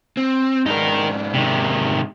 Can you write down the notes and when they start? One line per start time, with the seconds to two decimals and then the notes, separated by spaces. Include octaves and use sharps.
0.17 C4
0.66 G#2 D4 D#4 A#4
1.34 C3 D#3